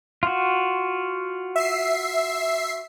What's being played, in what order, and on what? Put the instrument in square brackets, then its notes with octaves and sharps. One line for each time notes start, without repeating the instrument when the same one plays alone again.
[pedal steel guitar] F4 F#4
[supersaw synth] E5 C7